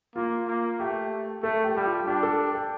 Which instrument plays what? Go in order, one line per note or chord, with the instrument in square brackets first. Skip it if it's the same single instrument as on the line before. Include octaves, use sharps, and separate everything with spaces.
[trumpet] A#3 [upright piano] F4
[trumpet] A#3
[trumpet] A3 [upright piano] G4
[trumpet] A3 [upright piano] A4
[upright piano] G4
[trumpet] G3 [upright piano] G4
[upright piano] F4
[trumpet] D4 [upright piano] G4
[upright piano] A4
G5